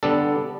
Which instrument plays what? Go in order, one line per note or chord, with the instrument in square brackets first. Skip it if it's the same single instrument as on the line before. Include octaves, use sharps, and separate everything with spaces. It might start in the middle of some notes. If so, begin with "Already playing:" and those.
[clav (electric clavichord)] D3 G3 B3 D4 A4